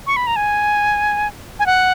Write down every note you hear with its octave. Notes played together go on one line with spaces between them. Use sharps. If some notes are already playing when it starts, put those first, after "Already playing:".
C#6
B5
A#5
G#5
G#5
F#5